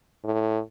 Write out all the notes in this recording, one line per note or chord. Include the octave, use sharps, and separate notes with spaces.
A2